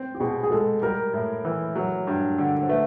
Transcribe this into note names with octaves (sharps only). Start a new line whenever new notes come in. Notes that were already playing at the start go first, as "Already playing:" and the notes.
Already playing: C4
G4
B2 G#4
G#4
G#3 A4
G3 A#4
A2
E3
F#3
G2
D3
C5
A3 B4